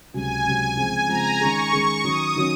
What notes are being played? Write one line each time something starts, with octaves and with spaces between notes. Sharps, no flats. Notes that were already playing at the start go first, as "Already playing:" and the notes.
C#2 C3 F#3 G#5
C#2 C3 F#3
C#3 F3 G#3 C4 F4
C#3 F3 G#3 C4 F4 A#5
D#3 G#3 C#4 G#4 C#6
D#3 G#3 C#4 G#4 C#6
D#3 F#3 C#4 D#6
D#3 F#3 C#4